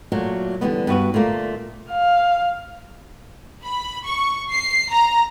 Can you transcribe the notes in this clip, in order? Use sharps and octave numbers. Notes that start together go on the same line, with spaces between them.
A#2 F#3 A3
D3 E3 G3 A3 B3
G2 B3 F#4 B4
A#2 D3 A3 A#3
F5
B5
C#6
C7
A#5